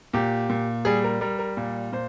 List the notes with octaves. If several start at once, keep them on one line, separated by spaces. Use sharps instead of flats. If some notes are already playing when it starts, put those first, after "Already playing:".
A#2 G4
A#2
G3 G#4
A#4
G3 A#4
A#4
A#2
A#2 C5